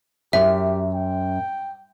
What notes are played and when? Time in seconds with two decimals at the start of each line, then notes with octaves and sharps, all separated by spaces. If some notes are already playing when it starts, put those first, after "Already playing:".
0.33 F#2 G4 E5
0.94 G5